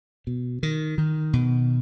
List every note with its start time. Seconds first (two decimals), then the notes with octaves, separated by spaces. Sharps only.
0.27 B2
0.63 D#3
0.98 D#3
1.33 B2